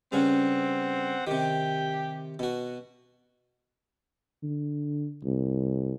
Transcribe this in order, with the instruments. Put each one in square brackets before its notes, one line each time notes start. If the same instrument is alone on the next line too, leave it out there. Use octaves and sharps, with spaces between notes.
[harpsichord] G2 C#3 C#4 [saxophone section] C4 F#5
[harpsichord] C3 D#3 [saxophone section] G4
[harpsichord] B2 F#4
[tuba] D3
C2